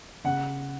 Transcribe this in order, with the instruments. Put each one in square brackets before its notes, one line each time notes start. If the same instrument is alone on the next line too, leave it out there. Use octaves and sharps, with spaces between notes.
[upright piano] C#3 F#5